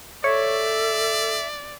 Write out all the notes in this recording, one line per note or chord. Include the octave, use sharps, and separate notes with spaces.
A4 C#5 D5 E5